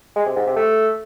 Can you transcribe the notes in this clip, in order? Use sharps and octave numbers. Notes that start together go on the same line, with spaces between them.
G#3
C3
G#2
C3
A3